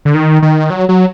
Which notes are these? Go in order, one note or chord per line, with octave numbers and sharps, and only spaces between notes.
D3
D#3
D#3
F#3
F#3